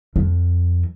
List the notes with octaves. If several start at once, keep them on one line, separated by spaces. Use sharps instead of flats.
F2